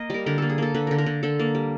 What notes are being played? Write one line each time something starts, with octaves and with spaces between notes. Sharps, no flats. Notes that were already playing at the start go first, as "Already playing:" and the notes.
Already playing: A#3 D#5 F5
G3 A#4
D3 A#4
A#3 A4
G#4
A#3 A4
D3 B4
D3 A#4
A#4
D3
D3 A4
A#3
G3